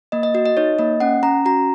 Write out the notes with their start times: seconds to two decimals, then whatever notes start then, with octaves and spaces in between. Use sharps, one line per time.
0.12 A#3 D#5
0.23 D#5
0.34 F#4 D#5
0.46 D#5
0.57 D#4 C#5
0.79 A#3 D#5
1.00 C#4 F#5
1.23 C#4 A#5
1.45 F#4 A#5